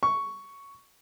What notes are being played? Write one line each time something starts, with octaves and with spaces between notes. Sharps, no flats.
C#6